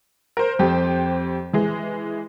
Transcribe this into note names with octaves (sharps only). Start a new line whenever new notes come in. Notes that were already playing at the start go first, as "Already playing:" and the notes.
A#4 C5
F2 G4 C5
E3 G#3 G#4